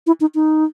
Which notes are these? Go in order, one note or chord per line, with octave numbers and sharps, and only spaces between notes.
E4
D#4
D#4